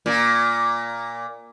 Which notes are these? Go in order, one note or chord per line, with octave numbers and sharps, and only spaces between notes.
A#2